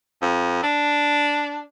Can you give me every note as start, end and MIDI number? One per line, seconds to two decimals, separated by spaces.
0.22 0.63 41
0.63 1.60 62